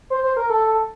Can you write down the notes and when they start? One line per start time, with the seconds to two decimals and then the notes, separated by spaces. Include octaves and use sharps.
0.10 C5
0.24 C5
0.37 A#4
0.50 A4